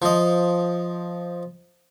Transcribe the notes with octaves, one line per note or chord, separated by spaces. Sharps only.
F3 D#5